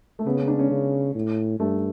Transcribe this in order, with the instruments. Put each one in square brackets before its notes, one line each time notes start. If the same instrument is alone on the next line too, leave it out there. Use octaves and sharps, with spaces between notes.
[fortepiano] A3
[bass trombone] C#3 [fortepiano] B3
[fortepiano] C#4
D4
C#4
[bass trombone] C#3
A2
[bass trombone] G2 [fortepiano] A3